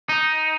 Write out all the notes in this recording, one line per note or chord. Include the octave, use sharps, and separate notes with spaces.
D#4